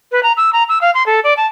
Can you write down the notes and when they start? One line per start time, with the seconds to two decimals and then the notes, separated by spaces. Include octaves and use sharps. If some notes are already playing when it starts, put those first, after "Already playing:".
0.12 B4
0.23 A#5
0.37 E6
0.53 A#5
0.69 E6
0.81 F5
0.94 C6
1.06 A4
1.24 D5
1.37 A5